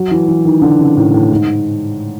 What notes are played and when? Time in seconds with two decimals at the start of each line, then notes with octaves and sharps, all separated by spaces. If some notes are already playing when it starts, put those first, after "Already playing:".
Already playing: F#3
0.11 E3
0.28 E3
0.45 D#3
0.62 D3
0.79 C#3
0.97 A2
1.14 A2
1.31 G#2